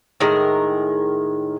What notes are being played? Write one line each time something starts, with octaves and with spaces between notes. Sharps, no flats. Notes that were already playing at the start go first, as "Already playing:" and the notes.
A2 D#3 G#3 A#4